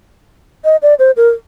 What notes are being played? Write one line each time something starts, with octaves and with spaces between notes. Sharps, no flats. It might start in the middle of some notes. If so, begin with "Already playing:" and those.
D#5
D5
C5
A#4